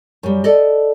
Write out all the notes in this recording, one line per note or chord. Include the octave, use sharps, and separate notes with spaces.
F#2 G3
A4 D5 D#5